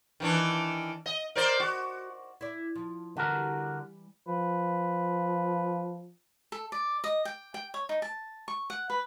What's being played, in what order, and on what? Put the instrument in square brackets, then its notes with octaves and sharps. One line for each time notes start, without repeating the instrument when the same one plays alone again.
[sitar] D#3 E3 D4
D#5
A#4 C5 D5
F#4
[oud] E4 D5
F3
[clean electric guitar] D3 F#4 A#4 [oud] E3 G3
[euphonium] F3 [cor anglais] B4
[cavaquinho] A4
D5
D#5
G5
G5
C#5
D#4
A5
C#6
F#5
B4